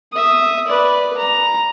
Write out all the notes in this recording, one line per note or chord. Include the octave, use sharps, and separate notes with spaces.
E5 D#6
B4 D5
A#5